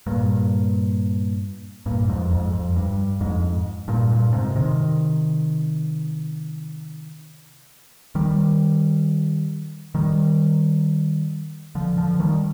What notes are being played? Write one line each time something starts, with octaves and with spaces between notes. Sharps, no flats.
G2 A#2
G2 A#2
F2 G#2
F2 G#2
F2
G2
F2 G#2
G2 A#2
G2 A#2
G#2 C3
C3 D#3
D#3 G3
D#3 G3
D3 F3
D3 F3
D#3 G3